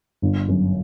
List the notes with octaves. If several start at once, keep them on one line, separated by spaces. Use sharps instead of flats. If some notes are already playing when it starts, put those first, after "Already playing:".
G1
F#2